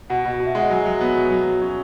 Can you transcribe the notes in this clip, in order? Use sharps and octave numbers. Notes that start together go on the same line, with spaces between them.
B2 F#5
B2
B2
E5
G#3 F#5
F#3 G#5
F#3
B3
B2
F#3
F#3
C#4